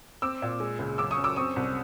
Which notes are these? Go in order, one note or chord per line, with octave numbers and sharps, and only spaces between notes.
C4 D6 E6
A#2
G#3
C#2
F#2 D6 E6
C#6 D#6
F#2
D6 E6
C4 C#6 D#6
C2